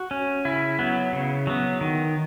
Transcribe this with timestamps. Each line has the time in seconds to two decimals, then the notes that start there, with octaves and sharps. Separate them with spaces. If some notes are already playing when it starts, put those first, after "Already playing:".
Already playing: F#4
0.11 C#4
0.45 C#3 E4
0.79 F#3 B3
1.13 C#3
1.47 F#3 B3
1.81 D#3